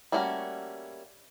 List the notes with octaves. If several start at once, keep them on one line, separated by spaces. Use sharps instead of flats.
G3 A3 A#3 C#4 F#4